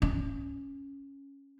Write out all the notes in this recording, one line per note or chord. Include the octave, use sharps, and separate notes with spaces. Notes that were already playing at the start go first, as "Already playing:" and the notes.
C#4